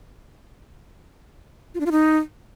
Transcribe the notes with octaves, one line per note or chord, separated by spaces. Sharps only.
F4
D4
F4
D#4